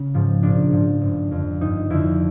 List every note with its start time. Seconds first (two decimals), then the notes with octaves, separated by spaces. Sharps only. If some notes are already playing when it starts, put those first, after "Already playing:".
Already playing: C#3 C#4
0.14 G#2 F3
0.43 A#1 D4
0.73 G#2 F3
1.01 G1
1.31 F2 D3
1.61 G1 D#4
1.90 F2 D3 E4